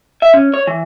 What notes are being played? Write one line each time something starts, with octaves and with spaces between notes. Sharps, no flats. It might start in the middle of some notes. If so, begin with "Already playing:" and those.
E5
C#4
C#5
E3